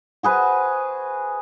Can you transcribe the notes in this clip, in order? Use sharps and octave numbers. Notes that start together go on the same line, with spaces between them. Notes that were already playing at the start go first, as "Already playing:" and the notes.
F#4 G#4 B4 C5